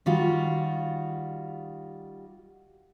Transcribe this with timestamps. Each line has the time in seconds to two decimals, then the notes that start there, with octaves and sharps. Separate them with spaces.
0.06 D#3 G3 F4 F#4